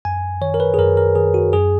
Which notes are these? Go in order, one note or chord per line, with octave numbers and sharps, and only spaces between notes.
F#2 G#5
D#3 C#5
A#4
B4
G#4
F#2 A#4
A#4
D#3 G#4
F#4
F#2 G#4